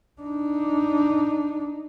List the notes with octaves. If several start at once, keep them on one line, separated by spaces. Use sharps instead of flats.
D4 D#4